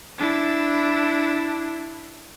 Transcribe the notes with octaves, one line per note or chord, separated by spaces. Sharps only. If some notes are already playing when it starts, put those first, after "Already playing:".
D4 E4